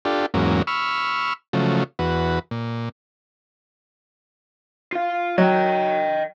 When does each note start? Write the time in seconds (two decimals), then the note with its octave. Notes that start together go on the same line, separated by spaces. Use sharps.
0.05 D4 F4 G4 A4
0.34 E2 G#2 F#3 A#3 C#4
0.67 B5 C#6 E6 F6
1.53 C#3 F3 F#3 A3
1.99 E2 F#4 B4
2.51 A#2
4.92 F4 F5
5.38 F#3 D#5 G5